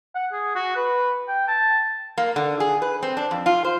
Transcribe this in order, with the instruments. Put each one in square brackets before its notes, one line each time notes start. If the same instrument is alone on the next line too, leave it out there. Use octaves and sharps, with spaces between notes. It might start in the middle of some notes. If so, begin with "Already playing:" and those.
[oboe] F#5
G#4
F#4
B4
G5
A5
[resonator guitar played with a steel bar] A#3
D3
G#4
B4
C4
D4
F2
F4
C5